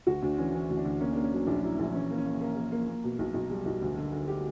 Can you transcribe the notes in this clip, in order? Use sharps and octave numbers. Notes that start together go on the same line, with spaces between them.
D2 F#4
D2 D4
E3 C#4
E3 C#4
D2
D4
D2
A#3 C#4
A#3 D4
C#4
F#3 D4
A#1 D4
F#3 E4
A#1 E4
E3 C#4
A#3
C#4
A#3
A#3 A#4
A#3
A#3
A#3
B2
B1
B1
G3
B1
D2
D3
D3
G4